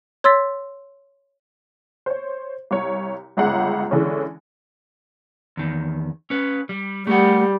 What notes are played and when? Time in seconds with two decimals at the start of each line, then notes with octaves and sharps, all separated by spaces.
0.24 C#5 C6 E6 A6 B6
2.06 C5 C#5
2.71 C2 C#5
3.37 G1 C#2 C#3 F#5
3.91 D3 E3 G#3 C#4
5.57 E2 D#3
6.30 C#4 B4
6.69 G3
7.07 G3 A3 A#4 F#5